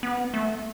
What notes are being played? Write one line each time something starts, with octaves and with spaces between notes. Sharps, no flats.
B3
A3